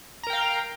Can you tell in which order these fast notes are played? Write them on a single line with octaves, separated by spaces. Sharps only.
A#5 A#4 G5 F5